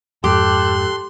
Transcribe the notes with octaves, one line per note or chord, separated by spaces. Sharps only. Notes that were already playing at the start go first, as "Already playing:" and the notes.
F2 G#2 G4 A4 C6 F#6